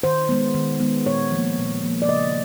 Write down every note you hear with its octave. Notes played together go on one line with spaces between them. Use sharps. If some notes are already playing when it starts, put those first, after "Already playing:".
D#3 C5
G#3 B3
D#3
G#3 B3
A#2 C#5
F3 A#3
A#2
F3 A#3
D5
C#3 D#5